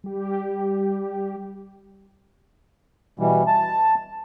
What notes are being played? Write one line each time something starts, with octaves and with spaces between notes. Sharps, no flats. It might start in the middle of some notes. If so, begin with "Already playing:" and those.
G3 G4
B2 E3 G3
A5